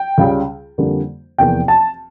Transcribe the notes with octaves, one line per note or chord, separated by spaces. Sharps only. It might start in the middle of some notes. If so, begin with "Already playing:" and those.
Already playing: G5
C#2 C#3 G3
F2 D3 G3 A#3
F1 E2 E3 A#3 G5
A5